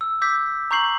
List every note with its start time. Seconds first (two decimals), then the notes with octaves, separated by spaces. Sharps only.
0.01 E6
0.22 D6 E6 G6 B6
0.71 A#5 C#6 G6 C7 F#7